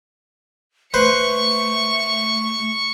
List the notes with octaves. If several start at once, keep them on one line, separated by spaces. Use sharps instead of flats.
A3 B4 C5 C#6 C#7